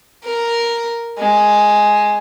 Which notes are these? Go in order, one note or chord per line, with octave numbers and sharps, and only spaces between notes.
A#4
G#3